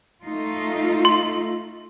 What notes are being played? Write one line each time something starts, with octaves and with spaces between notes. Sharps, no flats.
A3 D#4 F4
C6